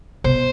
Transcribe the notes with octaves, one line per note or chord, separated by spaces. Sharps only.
B2 C5